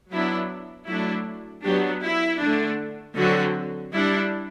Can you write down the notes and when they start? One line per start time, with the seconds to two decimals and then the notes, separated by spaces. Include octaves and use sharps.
0.11 F#3 B3 D4 E4
0.87 F#3 A3 D4 E4
1.64 F#3 B3 D4 G4
2.03 E4
2.40 D3 A3 D4
3.16 D3 F#3 C4 F#4
3.93 G3 D4 E4